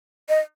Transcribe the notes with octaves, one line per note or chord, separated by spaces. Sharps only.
D#5